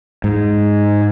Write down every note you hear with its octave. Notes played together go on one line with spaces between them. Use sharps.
G#2